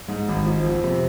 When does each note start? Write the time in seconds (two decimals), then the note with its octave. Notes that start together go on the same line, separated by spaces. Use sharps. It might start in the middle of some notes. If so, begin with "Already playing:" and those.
0.08 G#2
0.28 G#1
0.46 F3
0.65 F2
0.84 C3